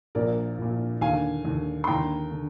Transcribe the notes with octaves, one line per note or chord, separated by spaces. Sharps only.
A#1 A#2 A#4 D5
A#1 A#2
D#2 D3 F5 G#5
D#2 D3
C6
D#2 D3 G5 A#5
D3